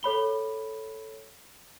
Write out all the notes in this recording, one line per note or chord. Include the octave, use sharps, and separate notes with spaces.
A4 C#5 B5 G7